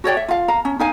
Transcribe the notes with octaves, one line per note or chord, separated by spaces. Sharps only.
F#4 C#5 D5 G5
E5
F4 F5
F5 A#5
C#4
D#4 F5 G#5